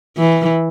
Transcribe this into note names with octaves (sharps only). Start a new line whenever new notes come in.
E3